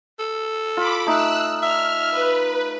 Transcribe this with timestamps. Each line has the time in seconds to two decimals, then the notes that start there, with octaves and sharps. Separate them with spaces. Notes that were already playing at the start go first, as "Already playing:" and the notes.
0.19 A4
0.77 F4 B5 D6
1.06 A3 D#4 E6 F#6
1.62 E5 F6
2.11 B4